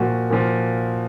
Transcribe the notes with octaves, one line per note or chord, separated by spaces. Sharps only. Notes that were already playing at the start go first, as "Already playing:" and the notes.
Already playing: A#2 F3 F#4
A#2 F3